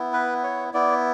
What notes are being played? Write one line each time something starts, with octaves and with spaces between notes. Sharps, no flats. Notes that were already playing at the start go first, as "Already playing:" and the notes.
Already playing: B3 E4
B4
C#5
B3 E4 D5